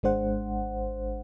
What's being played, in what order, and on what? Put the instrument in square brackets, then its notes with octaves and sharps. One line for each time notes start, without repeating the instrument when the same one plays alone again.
[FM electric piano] G#1 G#3 D4 C5 F#5